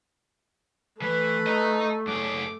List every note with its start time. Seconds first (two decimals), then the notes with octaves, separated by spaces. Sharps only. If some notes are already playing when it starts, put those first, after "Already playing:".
1.02 E3 A3 B4
1.47 D#5 A#5
2.07 F#2 G#4 D6